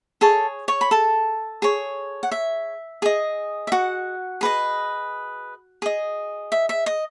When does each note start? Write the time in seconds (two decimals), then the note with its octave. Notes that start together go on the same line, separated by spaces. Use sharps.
0.21 G#4 A4 C#5 A5
0.68 C#5 C#6
0.81 B5
0.91 A4 A5
1.62 G#4 C#5
2.23 F#5
2.32 E5
3.02 G#4 D#5
3.67 E5
3.72 F#4 F#5
4.41 G#4 B4 D#5
5.82 G#4 D#5
6.52 E5
6.69 E5
6.86 D#5